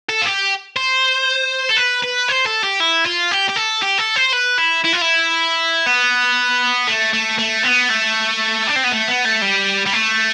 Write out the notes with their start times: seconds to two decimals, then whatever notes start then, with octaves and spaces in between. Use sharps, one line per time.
0.09 A4
0.22 F4
0.26 G4
0.76 C5
1.70 A4
1.78 B4
2.04 B4
2.29 C5
2.46 A4
2.63 G4
2.80 E4
3.05 F4
3.31 G4
3.49 G4
3.56 A4
3.83 G4
3.99 A4
4.16 C5
4.33 B4
4.58 E4
4.84 E4
4.93 F4
5.01 E4
5.86 B3
6.87 A3
7.13 A3
7.39 A3
7.64 B3
7.90 A3
8.68 D4
8.75 C4
8.84 B3
8.92 A3
9.08 B3
9.25 A3
9.42 G3
9.86 G3
9.93 A3